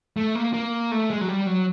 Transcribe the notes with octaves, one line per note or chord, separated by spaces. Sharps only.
A3
A#3
A#3
A3
G#3
F#3
G3
F#3